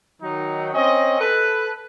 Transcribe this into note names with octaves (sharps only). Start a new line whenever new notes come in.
D#3 F#3 D#4
C4 C#4 D#5
A4 B4